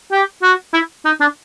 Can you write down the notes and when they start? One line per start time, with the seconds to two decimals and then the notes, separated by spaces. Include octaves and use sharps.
0.12 G4
0.43 F#4
0.74 E4
1.05 D#4
1.20 D4